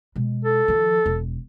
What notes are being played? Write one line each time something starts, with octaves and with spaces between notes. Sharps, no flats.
B2 G#3
A4
D#3 F3
E1